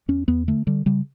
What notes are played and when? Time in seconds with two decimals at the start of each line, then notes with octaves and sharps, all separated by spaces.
0.08 E2 C#4
0.28 E2 B3
0.48 D3 A3
0.67 D3 G3
0.86 C#3 G3